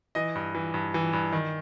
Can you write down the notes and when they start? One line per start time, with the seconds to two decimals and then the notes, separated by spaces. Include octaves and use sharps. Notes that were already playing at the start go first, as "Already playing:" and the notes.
0.15 E3 D#5
0.35 G2
0.55 E3
0.74 G2
0.94 E3
1.13 G2
1.32 D#3